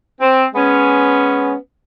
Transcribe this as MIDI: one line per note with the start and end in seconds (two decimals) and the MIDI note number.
0.21 0.44 60
0.54 1.54 56
0.54 1.54 59
0.54 1.54 61